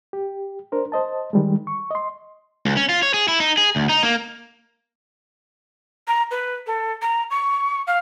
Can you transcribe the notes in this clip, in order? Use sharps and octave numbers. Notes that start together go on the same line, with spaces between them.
G4
D4 A#4 C5
C5 D#5 A5
D#3 G3 G#3
C#6
D#5 C6
C#2
C#4
F4
C#5
G#4
E4
D#4
G#4
D2
D#4
A#3
A#5
B4
A4
A#5
C#6
F5